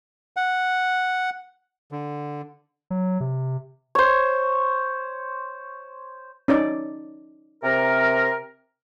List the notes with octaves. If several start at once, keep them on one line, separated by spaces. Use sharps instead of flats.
F#5
D3
F#3
C3
C5 C#5
C#4 D#4 D5
C3 A#4